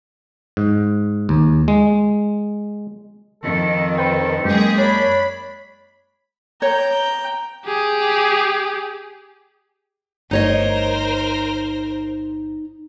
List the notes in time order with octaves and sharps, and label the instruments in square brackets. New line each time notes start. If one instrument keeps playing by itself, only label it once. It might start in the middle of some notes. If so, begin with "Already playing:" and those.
[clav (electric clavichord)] G#2
D#2
G#3
[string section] F2 D#3 [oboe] A4
[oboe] A4 [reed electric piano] B4 C5 G5
[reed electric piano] F#2 [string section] G#3 A#3 G#4 [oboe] G4
[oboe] D4 [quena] C#5 [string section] B5
[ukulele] C#5 [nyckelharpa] G5 A#5
[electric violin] G4 G#4
[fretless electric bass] G1 A3 [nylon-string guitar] D#4 C#5 D#5 [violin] A#4 C5